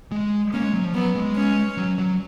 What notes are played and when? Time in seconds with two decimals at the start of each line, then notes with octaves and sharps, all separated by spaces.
0.12 G#3
0.53 A#3 C#4
0.64 G#3
0.73 F#3
0.84 F3
0.94 F#3 B3
1.15 G#3
1.36 C#4
1.77 F#3
1.98 F#3